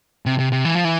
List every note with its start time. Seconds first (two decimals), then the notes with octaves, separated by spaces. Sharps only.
0.26 C3
0.39 C3
0.52 C3
0.65 E3
0.75 F3
0.85 E3